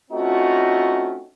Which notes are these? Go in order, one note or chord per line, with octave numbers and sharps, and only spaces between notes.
A3 C4 C#4 D#4 F4 F#4